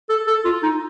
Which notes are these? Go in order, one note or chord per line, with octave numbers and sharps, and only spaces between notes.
A4
A4
F4
D#4